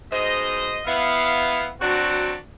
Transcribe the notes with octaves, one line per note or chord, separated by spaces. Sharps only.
G#2 B2 C5 D#5
B3 E4 F5
F#3 C4 D4 F#4